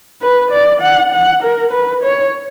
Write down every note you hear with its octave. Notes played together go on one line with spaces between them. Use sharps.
B4
D5
F#5
F#5
A#4
B4
C#5